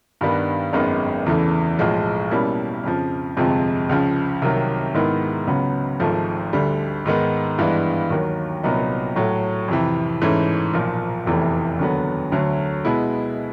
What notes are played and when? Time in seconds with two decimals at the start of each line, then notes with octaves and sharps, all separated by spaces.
0.21 G2 D#3 G3 B3 D4
0.73 G#1 F#2 D#3 G#3 B3
1.26 E2 C#3 E3 A3
1.79 B1 A2 F3 G#3
2.31 B2 G3 A#3 C#4 E4
2.84 F2 C#3 F3
3.37 G1 F2 C3 F3 G#3
3.89 C#2 C#3 F3
4.42 C2 C3 D#3 F#3
4.94 G#2 D#3 G#3 B3 E4
5.47 C#2 C#3 F#3 B3
6.00 G#1 G#2 F3 A3
6.53 D2 D3 G3
7.05 G#2 D#3 G#3 B3
7.58 G2 E3 G#3 B3 D4
8.10 D#2 D#3 F#3
8.63 C2 A#2 F#3 B3 D#4
9.16 A2 F#3 A3
9.68 F2 C3 E3
10.22 G#2 E3 A3 C#4
10.73 B1 A#2 F3 A#3
11.26 F1 E2 C3 E3 A3
11.79 D#2 D3 F#3 B3
12.32 D2 D3 F#3 A3
12.85 B2 G#3 B3 E4